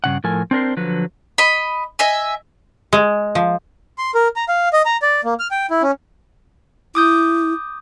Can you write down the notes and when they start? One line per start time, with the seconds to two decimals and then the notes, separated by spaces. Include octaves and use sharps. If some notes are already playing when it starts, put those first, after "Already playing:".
0.04 G2 C#3 F#5
0.24 A2 F3 A4 A#4 G#5
0.51 C4 D4 A#4 C5
0.77 D3 F3 F#3 B4
1.38 D#5 B5
1.99 D#5 E5 G#5
2.93 G#3
3.35 F3
3.98 C6
4.14 A#4
4.36 A#5
4.48 F5
4.73 D#5
4.85 A#5
5.02 D5
5.24 A#3
5.39 F6
5.51 G5
5.70 E4
5.82 C#4
6.95 E4 D6 D#6 G6